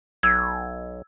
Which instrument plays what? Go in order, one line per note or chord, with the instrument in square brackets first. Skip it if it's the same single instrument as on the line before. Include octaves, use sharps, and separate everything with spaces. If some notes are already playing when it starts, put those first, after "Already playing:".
[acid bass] B1 [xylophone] E6 G#6